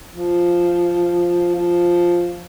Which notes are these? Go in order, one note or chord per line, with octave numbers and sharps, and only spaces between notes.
F3
F3